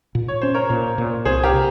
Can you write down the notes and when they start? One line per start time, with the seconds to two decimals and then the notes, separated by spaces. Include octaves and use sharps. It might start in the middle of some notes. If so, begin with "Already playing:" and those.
0.15 A#2
0.28 C#5
0.42 C#4 C5
0.54 A#4 C#5
0.70 A#2
0.98 A#2
1.25 C2 G#4 C5
1.44 G4 A#4
1.54 C3